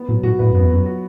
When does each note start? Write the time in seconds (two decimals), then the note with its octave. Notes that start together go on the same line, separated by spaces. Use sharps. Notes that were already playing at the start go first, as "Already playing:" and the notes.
Already playing: B3
0.08 A2 F#3
0.23 A2 F#4
0.39 A2 B4
0.50 F#2 B3
0.62 E2
0.70 F#2 F#3
0.85 F#4